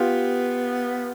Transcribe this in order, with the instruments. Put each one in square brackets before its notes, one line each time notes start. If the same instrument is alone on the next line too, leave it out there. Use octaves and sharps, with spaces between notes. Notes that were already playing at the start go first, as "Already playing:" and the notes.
Already playing: [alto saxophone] B3 [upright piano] F4 G4